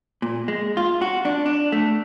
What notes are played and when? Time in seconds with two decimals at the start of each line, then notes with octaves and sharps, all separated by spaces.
0.22 A#2
0.48 G#3
0.77 F4
1.02 F#4
1.25 D4
1.46 D4
1.72 A3